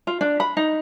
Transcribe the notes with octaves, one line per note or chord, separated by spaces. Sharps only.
F4
D4
B5
D#4